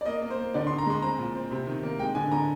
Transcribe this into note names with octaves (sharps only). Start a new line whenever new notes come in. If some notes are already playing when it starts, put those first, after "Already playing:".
D5
A#3 D#5
A#3
C5
A#3
D3 D5
C6
D3
A#5
G#3 C6
C4 A#5
A#2
C4
C3
D#3
A#3
G#3 G5
D3 G#5
D3 A#5